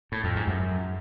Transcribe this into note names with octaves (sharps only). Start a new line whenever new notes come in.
A2
F2
G#2
F#2